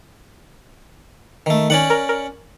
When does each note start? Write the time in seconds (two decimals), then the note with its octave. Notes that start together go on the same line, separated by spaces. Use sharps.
1.46 D#3 A3
1.70 D#3 C#4 D5 F#5
1.90 A#4
2.09 A#4